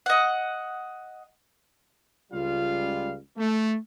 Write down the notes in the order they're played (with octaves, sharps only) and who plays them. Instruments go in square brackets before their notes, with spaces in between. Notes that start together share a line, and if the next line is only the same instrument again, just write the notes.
[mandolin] D#5 F#5
[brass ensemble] C#2 G3 F4 F5
A3